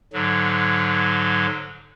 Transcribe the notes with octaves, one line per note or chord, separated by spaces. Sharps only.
G#2 D3 F#3